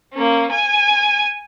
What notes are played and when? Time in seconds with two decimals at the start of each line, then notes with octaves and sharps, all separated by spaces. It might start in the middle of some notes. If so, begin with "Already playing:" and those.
0.14 A#3 C#4
0.51 G#5 D#7